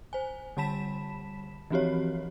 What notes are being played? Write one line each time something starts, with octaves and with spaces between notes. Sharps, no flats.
C5 G#5
D3 G3 A5 B5 B6 E7
E3 F3 C4 F#4 G4 C#5